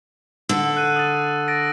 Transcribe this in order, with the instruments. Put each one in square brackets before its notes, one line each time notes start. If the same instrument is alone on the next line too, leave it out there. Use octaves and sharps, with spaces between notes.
[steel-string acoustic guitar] D3 [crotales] E6
[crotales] F#6 D#7
D#6 A6
A6 A#6 D7